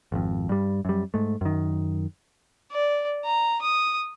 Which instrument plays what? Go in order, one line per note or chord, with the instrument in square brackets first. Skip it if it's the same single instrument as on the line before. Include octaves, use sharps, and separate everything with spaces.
[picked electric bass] G#1 F2
G2 G3
F#2 G3
G#2 A3
F#2 D#3
[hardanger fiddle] D5
A#5
D#6